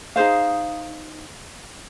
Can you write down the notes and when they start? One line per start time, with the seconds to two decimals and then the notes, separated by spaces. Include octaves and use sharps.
0.16 D#4 G#4 C5 F5